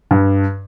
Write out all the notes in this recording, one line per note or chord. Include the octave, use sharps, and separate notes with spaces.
G2